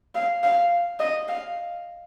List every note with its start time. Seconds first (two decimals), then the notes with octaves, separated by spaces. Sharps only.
0.15 F5
0.43 F5
0.99 D#5
1.28 F5